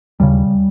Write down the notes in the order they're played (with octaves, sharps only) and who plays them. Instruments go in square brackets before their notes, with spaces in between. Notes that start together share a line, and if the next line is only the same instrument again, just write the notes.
[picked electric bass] D#2 C#3 G3